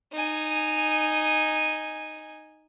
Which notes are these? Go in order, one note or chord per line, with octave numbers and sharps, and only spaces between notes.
D#4 G#5